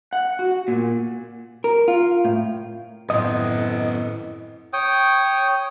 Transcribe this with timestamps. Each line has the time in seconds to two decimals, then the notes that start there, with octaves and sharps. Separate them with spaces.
0.13 F#5
0.39 F#4
0.68 A#2
1.64 A#4
1.88 F4
2.25 A2
3.10 F#2 A2 B3 C4 D#5
4.73 C#5 G5 D#6